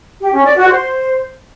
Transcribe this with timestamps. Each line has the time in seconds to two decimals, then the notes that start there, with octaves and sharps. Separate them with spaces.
0.21 G4
0.33 C#4
0.45 D5
0.57 F#4
0.69 C5